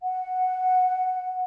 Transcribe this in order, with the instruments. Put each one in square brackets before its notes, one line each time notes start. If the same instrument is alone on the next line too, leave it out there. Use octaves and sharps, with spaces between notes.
[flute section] F#5